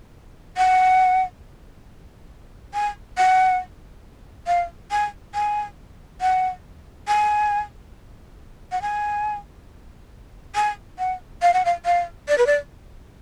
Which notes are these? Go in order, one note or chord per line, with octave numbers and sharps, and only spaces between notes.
F#5
G#5
F#5
F5
G#5
G#5
F#5
G#5
F#5
G#5
G#5
F#5
F5
F#5
F5
F5
D5
B4
D5